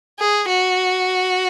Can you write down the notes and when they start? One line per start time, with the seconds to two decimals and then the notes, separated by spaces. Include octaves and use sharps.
0.19 G#4
0.49 F#4